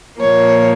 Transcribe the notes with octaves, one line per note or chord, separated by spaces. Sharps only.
A#2 F3 A#3 C#5